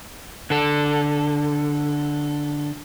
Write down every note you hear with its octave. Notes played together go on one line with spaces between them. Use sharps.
D3 A4